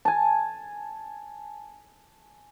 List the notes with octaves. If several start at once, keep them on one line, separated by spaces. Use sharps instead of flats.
G#5 A5